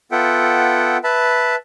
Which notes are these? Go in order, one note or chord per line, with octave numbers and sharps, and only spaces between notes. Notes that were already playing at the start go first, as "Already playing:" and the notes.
B3 F4 A4 E5 F#5 G5
B4 E5 A5 B5